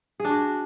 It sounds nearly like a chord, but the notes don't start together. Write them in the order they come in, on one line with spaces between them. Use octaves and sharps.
G#4 D4 F#4